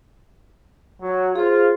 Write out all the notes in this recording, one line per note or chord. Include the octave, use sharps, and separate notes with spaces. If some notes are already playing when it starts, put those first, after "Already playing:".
F#3
F4 G#4 C5